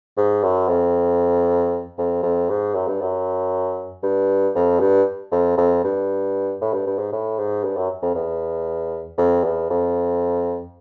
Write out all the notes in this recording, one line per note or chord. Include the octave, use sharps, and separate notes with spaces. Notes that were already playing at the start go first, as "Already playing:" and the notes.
G#2
F#2
F2
F2
F2
G#2
F#2
G2
F#2
G2
F2
G2
F2
F2
G2
A2
G2
G2
G#2
A2
G#2
G2
F#2
F2
E2
F2
E2
F2